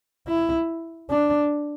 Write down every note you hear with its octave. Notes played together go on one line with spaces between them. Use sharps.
E4
D4